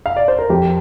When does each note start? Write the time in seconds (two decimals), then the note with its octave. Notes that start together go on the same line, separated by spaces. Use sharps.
0.06 F5
0.17 D5
0.28 C5
0.39 A#4
0.50 F2 G4